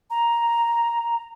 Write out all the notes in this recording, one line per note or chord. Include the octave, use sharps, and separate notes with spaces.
A#5